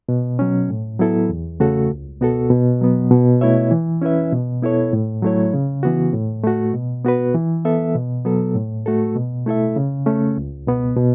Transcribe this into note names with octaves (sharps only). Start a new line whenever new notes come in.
B2
F#3 C#4
A2
F#3 B3 E4 A4
E2
C#3 A3 F#4 A4
C#2
B2 B3 F#4 A4
B2
F#3 B3
B2
A3 E4 C#5 E5
E3
C#4 E4 B4 E5
B2
B3 E4 A4 C#5
A2
F#3 A3 E4 C#5
C#3
E3 B3 F#4
A2
A3 F#4
B2
B3 F#4 B4
E3
B3 A4 E5
B2
F#3 B3 A4
A2
A3 F#4 A4
B2
A3 E4 A4 E5
C#3
A3 C#4
C#2
B2 B3
B2